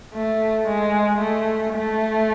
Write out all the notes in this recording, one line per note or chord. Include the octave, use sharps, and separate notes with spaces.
A3
G#3
A3
A3